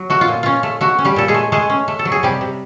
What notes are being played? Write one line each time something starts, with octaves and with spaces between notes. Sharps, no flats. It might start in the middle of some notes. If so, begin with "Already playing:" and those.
Already playing: F#3
A3 F#4
F4
A#2
C#4 F4
A3
A3 F#4
C#4
G3 G4
A#2 A4
G#3 G#4
A3
G#3 A3 G#4
C#4
A3
A4
F#3
G#4
C3 G3 G4
C3